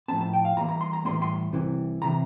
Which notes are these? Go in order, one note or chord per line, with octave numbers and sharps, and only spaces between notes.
A2 F3 C4 A5
A5
G5
F5
A2 E3 G3 A#3 A#5
A#5
C6
A#5
A2 E3 G3 A#3 C6
C6
C2 C3 E3
C3 E3 A#5